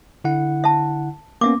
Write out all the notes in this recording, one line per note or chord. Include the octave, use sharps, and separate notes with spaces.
D3 E4 F#5
E5 A5
A#3 B3 C#4 E5 D6